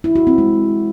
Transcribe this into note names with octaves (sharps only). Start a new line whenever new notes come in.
E4
F#4
C4
G#3